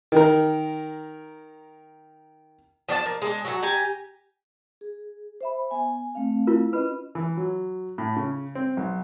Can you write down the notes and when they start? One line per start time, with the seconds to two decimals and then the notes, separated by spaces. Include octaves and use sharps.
0.12 D#3 A#4
2.89 F3 D4 D5 A5
3.06 A#3
3.22 G#3 D4
3.45 F#3 F#4 G4 A4
3.63 G4 G#5 A#5
4.81 G#4
5.41 C5 E5 B5
5.71 B3 G#5
6.15 A3 C4 F5
6.47 E4 F4 A#4
6.73 C#4 B4 D#5 B5
7.15 E3
7.37 F#3
7.98 A2
8.16 C#3
8.55 C4
8.77 B1